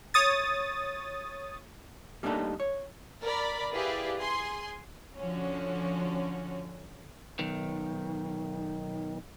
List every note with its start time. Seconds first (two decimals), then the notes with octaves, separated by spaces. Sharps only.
0.14 C#5 D#6 A6
2.23 G3 A3 A#3 D4 D#4 A4
2.60 C#5
3.23 A#4 D5 B5
3.73 E4 G4 G#4 B4 D5 F5
4.19 G#4 G#5 C6
5.17 D3 F3 C#4 F#4
7.39 B1 D#3